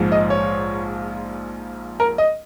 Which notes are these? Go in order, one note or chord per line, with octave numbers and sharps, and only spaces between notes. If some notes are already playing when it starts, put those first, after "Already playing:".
Already playing: A#1 G#2 F3
D#5
C#5
A#4
D#5